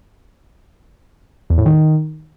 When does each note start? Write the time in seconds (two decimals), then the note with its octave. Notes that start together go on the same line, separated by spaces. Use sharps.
1.50 E2
1.58 A2
1.66 D#3